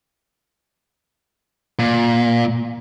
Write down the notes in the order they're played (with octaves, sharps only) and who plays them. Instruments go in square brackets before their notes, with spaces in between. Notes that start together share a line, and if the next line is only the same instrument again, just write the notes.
[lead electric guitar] A#2